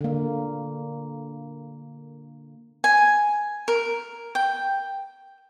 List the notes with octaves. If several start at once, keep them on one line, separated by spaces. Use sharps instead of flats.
D3 A#3
G#5
A#4
G5